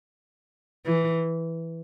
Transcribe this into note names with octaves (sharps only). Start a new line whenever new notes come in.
E3